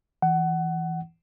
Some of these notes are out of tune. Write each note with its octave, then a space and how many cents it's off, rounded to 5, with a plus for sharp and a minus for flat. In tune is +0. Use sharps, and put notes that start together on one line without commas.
E3 +0 F#5 +20